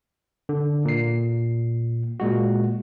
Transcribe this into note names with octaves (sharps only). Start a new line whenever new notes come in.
D3
A#2 C7
A#2 G#3 F#4